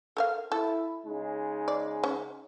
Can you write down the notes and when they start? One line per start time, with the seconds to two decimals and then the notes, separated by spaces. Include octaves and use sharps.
0.17 A4 A#4 F5
0.52 E4 A4
1.06 C#3 G#3 D#4
1.68 D5
2.04 C#4